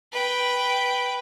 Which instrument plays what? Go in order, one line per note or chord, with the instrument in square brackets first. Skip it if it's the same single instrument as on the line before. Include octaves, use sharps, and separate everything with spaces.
[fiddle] B4 G5